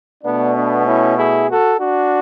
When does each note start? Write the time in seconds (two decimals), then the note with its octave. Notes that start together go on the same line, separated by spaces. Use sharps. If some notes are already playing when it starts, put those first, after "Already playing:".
0.24 B2 A3 B3 D4
0.55 B3 D4
0.86 C#4 E4
1.17 E4 G#4
1.49 F#4 A4
1.79 D4 F#4